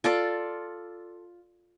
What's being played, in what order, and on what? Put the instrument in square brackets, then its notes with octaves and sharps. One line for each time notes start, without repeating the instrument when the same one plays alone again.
[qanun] F4 A4 D5